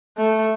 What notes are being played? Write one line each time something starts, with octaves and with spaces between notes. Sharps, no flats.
A3